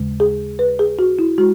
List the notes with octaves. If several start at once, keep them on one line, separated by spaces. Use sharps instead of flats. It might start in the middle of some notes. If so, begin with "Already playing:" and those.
Already playing: D#2 C#3 G#3
G#4
B4
G#4
F#4
E4
G#3 F#4